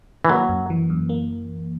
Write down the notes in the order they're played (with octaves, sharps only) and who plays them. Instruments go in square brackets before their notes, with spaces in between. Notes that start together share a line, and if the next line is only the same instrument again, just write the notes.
[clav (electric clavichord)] E3
[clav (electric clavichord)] F#3 [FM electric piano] A#3
[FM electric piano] F#2
E3
F#2
A#3